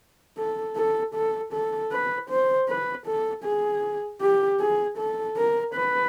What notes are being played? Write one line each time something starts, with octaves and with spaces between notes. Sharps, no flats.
A4
A4
A4
A4
B4
C5
B4
A4
G#4
G4
G#4
A4
A#4
B4